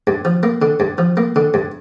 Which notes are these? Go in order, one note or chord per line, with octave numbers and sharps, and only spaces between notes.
G2
F3
A#3
D3
G2
F3
A#3
D3
G2